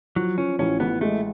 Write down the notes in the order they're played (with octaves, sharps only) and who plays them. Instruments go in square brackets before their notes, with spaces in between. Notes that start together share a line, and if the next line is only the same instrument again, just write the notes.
[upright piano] F3 [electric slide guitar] F#3
[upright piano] F3 [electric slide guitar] C#4
[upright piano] A1 [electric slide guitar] C#4
[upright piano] A1 [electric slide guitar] B3
[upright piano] G#3 [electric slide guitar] A3